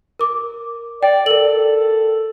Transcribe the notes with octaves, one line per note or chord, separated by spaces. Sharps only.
A#4 D6
D5 G5
A4 A#4 F#7